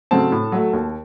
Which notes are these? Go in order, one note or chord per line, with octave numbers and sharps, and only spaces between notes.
C#3 F#3 A3 C4 A5
A2
F#3 A3
D#2